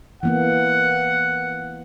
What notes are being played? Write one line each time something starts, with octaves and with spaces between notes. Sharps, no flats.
E3 A#3 B3 F#5